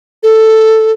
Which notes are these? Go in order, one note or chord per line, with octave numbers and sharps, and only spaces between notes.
A4